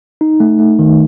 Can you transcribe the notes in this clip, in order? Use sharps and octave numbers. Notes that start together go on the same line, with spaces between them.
D#4
A3
A3
D#3